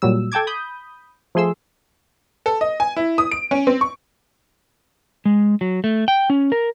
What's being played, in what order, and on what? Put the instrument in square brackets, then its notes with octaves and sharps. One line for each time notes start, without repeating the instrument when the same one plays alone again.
[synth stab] A#2 F#3 G3 E6
A4 G5 A5 D6 G#6
B5 D#6 G6
F3 A3 G#4 C6 E6
[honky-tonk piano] A4
D#5
G#5
E4
D#6
D7
C#4
C4
C#6
[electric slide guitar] G#3
F#3
A3
G5
C#4
A#4